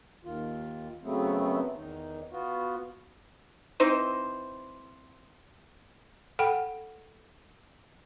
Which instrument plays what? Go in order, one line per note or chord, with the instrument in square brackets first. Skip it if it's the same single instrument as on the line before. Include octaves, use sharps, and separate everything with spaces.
[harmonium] D#2 D#3 F4
F#2 C#3 F#3 A3 B3 C4
E2 D#3 D#4
B3 F4 F#4
[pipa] E3 C4 D#4 C5
[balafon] A4 F#5 G5 B5